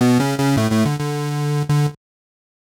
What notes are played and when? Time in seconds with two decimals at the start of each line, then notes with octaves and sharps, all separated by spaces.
0.01 B2 B3
0.20 C#3 C#4
0.38 C#3 C#4
0.57 A2 A3
0.71 A2 A3
0.85 D3
0.99 D3
1.69 D3